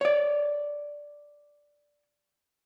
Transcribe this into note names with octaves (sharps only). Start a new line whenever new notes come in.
C#5 D5